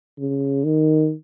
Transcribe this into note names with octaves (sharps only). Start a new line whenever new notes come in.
C#3
D#3